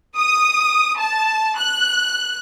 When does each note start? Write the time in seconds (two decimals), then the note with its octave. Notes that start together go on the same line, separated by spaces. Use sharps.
0.17 D#6
0.99 A5
1.58 F#6